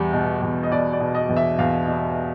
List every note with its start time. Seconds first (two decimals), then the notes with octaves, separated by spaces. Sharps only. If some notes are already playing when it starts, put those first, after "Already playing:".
Already playing: E2 G3
0.13 B2
0.42 E2
0.63 D#5
0.71 B2 D5
0.93 D5
1.00 B2
1.15 D#5
1.29 E2
1.37 E5
1.59 E2 F5
1.87 B2